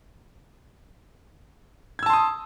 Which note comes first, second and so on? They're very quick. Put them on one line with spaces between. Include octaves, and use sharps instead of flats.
G#6 E6 A5 C6 D#6